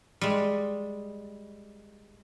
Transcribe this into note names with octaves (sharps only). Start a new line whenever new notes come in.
G3 G#3